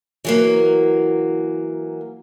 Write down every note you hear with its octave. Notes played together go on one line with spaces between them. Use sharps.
E3 F#3 A#3